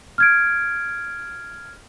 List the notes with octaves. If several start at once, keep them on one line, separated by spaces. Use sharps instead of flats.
F6 G#6 D7